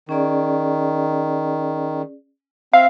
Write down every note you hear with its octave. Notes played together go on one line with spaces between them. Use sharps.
D#3 C#4 G#4 D5
C4 E5 F5